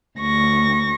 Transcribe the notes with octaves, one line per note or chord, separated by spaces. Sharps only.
D2 C#6 A#6